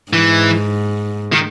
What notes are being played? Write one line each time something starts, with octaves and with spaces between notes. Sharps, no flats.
G#2 E3
D#3